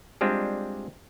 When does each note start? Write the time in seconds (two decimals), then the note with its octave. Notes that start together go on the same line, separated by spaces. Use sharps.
0.21 G3 G#3 C4 D4 F4